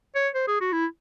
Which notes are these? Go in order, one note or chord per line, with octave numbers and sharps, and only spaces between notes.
C#5
C5
G#4
F#4
E4